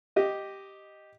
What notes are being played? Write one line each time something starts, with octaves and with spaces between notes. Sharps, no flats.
G4 D#5